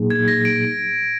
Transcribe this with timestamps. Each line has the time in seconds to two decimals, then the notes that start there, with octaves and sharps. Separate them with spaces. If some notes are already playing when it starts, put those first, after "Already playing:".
Already playing: A#2 F#3 A#3 D#4 G#4
0.10 G#6
0.28 A#6
0.45 D7